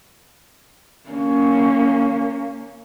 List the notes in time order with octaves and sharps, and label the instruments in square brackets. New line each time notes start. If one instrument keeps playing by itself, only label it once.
[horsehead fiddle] A#3 C#4